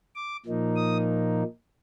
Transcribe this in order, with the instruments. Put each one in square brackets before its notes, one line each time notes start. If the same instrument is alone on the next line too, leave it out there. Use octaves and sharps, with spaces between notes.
[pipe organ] D6
A#2 F3 A#3 D#4
D#6